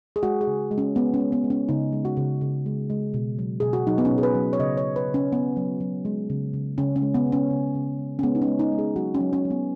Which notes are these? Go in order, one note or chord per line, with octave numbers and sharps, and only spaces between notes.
G#4
G#3 F#4
G#4
C#3
G#3
C#4
G#3 B3
C#4
G#3
B3
G#3
C#4
C#3 D#4
G#3
F#4
C#3
C#3
G#3
G#3
B2
F#3
B2 G#4
F#4
F#3 D#4
B3
C#4
B2
G#4
B4
F#3
C#5
C#3 D#5
C#5
C#3
B4
C#3
C#4
F#3 B3
F#3
F#3
G#3
C#3
C#3
C#3 C#4
C#4
G#3
B3
C#3
C#4
C#3
C#3
G#3
C#4
G#3 B3
D#4
C#4
G#3
D#4
G#3
G#4
F#3 F#4
C#4
F#3
C#4
F#3
B3